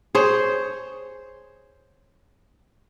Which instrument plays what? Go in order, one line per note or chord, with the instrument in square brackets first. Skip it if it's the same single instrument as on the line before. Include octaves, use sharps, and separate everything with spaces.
[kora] G#4 C5 C#5